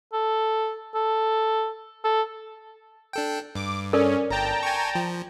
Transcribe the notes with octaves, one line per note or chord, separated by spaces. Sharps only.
A4
A4
A4
D4 A4 G5
G2 D6
C#4 A4 A#4 D5
G1 G5 A5 A#5
G#5 C#6
F3